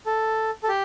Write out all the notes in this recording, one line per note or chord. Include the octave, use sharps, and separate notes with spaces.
A4
A4
G4